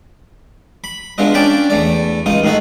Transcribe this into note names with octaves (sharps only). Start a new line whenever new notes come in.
B5
G#3 B3 D4 F4 D#5
C#4 D4 D5 G5 A5 B5
E2 A3 D5
C#2 D#4 F4 D#6
A2 D#3 D#4 F#4 A4